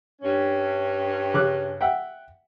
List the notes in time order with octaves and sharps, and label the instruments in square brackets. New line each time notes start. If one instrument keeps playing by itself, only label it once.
[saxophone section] G2 C#4
[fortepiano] C#3 D6 F#6
E5 F#5 G5